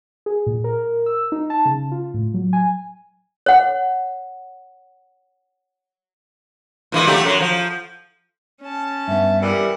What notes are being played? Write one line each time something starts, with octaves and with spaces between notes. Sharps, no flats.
G#4
A#2
A#4
E6
D#4
A5
C#3
F4
A2
F#3
G#5
C#5 F#5
A#2 E3 G#3
F#3 A3 G4
F#2 F#3
F3
C#4 A5
G2 B3 E5
E3 G3 A#4 F#5